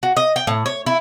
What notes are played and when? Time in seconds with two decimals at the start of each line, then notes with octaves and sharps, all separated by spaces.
0.03 F#4
0.17 D#5
0.36 G5
0.47 A2
0.66 C#5
0.86 E4